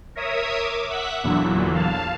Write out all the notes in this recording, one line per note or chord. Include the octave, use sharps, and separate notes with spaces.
A#4 C#5 E5 D#6
D6
E5 F#5 B6
E2 A#2 D3 E3 F#3
F5 A5